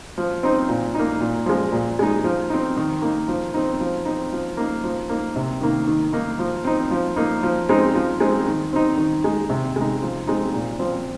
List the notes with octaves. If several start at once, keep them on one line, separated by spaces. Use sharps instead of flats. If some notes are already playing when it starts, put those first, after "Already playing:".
F3
C4 D#4
A#2
A#3 D#4
A#2
F3 G#3
A#2
G#3 D#4
F3
C4 D#4
D#3
A#3 D#4
F3
C4 D#4
F3
C4 D#4
F3
A#3 D#4
F3
A#3 D#4
C3
D#3 A#3 D#4
D#3
A#3 D#4
F3
C4 D#4
F3
A#3 D#4
F3
G#3 C4 D#4
F3
G#3 C4 D#4
D#3
C4 D#4
D#3
G#3 D#4
C3
G#3 D#4
F3
G#3 C4 D#4
A#2
F3 C4